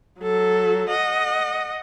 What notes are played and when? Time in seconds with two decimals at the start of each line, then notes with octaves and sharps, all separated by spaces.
0.19 F#3 A4
0.89 D#5 F#5